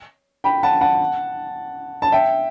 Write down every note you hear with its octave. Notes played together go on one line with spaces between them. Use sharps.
G5 B5
F#5 A5
F#5 A5
A5
E5 G5